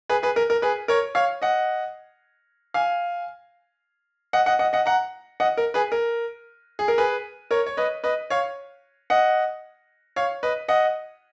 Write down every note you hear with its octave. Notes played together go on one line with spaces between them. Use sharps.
G#4 B4
G#4 B4
A#4
A#4
G#4 B4
A#4 C#5
C#5 F5
D#5 F#5
F5 G#5
D#5 F#5
D#5 F#5
D#5 F#5
D#5 F#5
F#5 A#5
D#5 F#5
A#4
G#4 B4
A#4
G#4
A#4
G#4 B4
A#4 C#5
C#5
B4 D#5
B4 D#5
C#5 F5
D#5 F#5
C#5 F5
B4 D#5
D#5 F#5